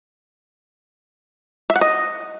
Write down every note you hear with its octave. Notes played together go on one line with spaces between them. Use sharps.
E5
F#5
D#5